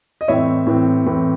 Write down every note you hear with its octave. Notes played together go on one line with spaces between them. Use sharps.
D#5
A2 E3 C4 C#5 E5
A2 E3 C4
A2 E3 C4